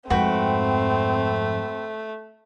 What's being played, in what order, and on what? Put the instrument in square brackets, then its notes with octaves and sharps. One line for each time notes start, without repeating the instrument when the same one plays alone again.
[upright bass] F2 G#2 [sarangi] A3 [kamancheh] C4 [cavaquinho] F#4 B4 G5